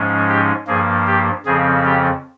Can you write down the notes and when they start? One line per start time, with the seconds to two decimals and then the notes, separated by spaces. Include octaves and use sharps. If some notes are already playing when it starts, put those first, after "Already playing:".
Already playing: G#2 F3 G#3 C#4
0.29 G4
0.67 G2 F3 A#3 G#4
1.07 G4
1.46 F2 C#3 F3 C4 G#4
1.85 G4